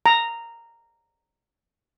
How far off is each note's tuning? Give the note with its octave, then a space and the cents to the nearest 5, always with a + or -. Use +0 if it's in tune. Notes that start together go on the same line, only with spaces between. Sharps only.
A#5 -10